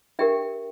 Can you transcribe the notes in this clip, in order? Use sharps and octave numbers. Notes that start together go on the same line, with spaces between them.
D4 G4 A#4 E5 G5